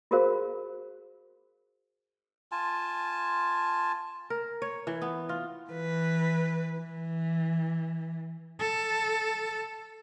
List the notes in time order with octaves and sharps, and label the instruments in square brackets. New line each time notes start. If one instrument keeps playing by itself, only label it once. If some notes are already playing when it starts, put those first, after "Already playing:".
[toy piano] F4 F#4 G#4 A#4 C5 F5
[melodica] F4 G#5 A5
[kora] A#4
C#5
E3
B3
F4
[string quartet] E3 B4
E3
[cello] A4